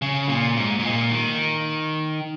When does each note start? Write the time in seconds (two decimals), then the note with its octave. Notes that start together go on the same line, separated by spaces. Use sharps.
0.02 C#3
0.29 A#2
0.57 G#2
0.80 G#2
0.85 A#2
1.12 D#3